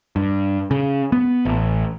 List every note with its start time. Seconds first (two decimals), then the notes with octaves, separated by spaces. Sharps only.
0.16 G2
0.71 C#3
1.12 B3
1.45 A1